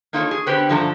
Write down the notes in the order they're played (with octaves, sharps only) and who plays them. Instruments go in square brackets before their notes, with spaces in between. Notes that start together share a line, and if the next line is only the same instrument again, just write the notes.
[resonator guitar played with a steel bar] A#3 D#4 F4 A4 B4 C#5
G#4
D3 B3 C#4 G4 B4 C5
G2 D3 F3 A3 A4 A#5